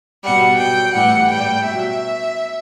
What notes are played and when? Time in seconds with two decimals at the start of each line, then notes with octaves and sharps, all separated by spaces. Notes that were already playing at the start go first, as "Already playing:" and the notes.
0.23 B2 G3 F#5
0.59 B2 F#3 G5
0.94 A2 E3 G3 F#5
1.29 A2 G3 G5
1.64 B2 F#3 E5